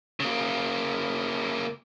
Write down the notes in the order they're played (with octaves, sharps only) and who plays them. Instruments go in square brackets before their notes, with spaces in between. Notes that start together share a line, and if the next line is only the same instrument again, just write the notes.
[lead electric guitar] C#3 A#3